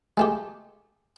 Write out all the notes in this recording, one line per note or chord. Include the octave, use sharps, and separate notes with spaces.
G#3 A3 G4